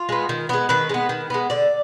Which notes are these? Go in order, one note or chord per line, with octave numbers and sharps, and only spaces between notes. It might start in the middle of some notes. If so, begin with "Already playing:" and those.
Already playing: F4
G#3 B3
D#3
G#3 B3
D#3 B4
G#3 B3
D#3
G#3 B3
D3 D5